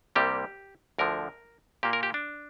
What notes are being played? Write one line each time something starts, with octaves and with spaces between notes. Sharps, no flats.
C2 C3 G3 A#3 G4
D2 D3 F3 A#4
A#2 A#3 G4
A#4
G4
D4